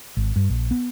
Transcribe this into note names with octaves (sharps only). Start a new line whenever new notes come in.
G#1
G2
A#1
B3